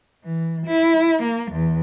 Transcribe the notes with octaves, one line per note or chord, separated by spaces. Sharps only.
E3
E4
A#3
E2